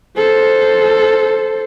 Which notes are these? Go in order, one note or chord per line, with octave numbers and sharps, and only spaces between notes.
A4 C5